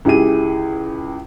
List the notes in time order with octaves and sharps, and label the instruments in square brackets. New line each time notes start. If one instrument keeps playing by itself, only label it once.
[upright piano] C#2 E4 G4 G#4 D#7